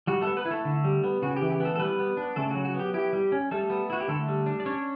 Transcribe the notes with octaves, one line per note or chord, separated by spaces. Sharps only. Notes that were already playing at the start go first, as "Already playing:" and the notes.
G3 F#4
A3 B3 A4
B3 B4
E4
A3 A4
D3
G3
B3
C#3 F#4
G4
E3
G4
A3 B3 A4
A4
G3 B3 B4
B3
D4
C#3 A3 A4
F#3 F#4
F#4
B3
G4
E4 G4
G3
C#4
G3 A3 A4
B3
E4 F#4
G4
D3 A3 A4
G3
D4
D5
C#4 D4 C#5